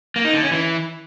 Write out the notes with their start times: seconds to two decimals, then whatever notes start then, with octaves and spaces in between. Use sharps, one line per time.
0.16 A#3
0.25 D#4
0.34 D3
0.43 C#4
0.51 E3